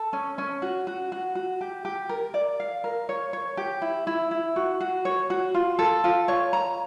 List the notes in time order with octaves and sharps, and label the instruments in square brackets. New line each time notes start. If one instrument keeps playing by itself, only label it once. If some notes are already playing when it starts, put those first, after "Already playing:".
Already playing: [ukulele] A4
C#4
C#4
F#4
F#4
F#4
F#4
G4
G4
A#4
D5
F5
A#4
C#5
C#5
G4
E4
E4
E4
F#4
F#4
C#5
F#4
F4
A4
F4
C#5
A#5